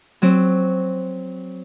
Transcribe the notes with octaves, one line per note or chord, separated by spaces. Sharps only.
F#3 C4